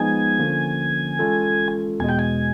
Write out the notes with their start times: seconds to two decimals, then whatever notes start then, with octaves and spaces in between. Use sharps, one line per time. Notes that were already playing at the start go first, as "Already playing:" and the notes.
Already playing: F3 G#3 B3 D#4 G#4 G#5
0.39 D3 F3 A#3 C#4
1.19 E3 G#3 C#4 F4 A4
2.00 E2 B2 G#3 G#5
2.09 G5
2.19 G#5